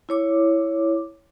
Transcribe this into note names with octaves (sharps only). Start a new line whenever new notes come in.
E4 C#5 D6